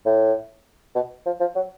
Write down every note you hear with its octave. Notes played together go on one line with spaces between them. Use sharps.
A2
B2
F3
F3
F#3